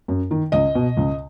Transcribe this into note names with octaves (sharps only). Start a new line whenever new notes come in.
F#2
D#3
C#2 D#5
B2
C#2